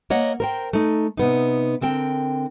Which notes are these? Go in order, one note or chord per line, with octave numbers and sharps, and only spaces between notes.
A#3 C#5 D#5 F#5
A#4 C5 G5
A3 D#4
C3 B3 D#4
D3 C4 A#4 G5